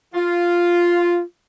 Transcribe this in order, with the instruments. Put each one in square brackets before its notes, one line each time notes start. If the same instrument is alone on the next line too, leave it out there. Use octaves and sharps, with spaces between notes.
[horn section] F4